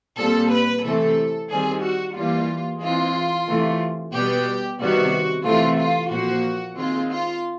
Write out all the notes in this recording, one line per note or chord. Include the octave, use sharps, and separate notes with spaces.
A#2 G3 C4 A4
B4
C3 E3 A3 C4 A4
D#3 G3 C4 G#4
F#4
E3 G3 A#3 F4
E3 G#3 C4 F4
C3 E3 A3
B2 G3 B3 G4
C3 D#3 G3 B3 F#4
C3 E3 A3 C4 F4
F4
A#2 F3 A#3 F#4
D#3 G#3 C4 F4
F4